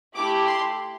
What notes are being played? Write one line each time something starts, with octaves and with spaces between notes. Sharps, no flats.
A3 E4 G4 D6
C6